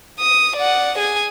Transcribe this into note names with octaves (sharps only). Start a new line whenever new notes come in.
D#6
D5 F#5
G#4 G#5